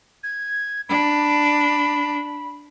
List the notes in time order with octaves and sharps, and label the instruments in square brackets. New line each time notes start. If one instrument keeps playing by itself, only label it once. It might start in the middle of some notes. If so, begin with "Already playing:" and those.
[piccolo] G#6
[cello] D4 [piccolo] B5